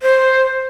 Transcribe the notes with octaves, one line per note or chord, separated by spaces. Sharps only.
C5